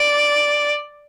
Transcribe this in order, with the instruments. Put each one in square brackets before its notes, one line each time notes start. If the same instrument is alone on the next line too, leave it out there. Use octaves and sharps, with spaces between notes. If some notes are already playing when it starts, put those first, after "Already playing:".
Already playing: [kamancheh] D5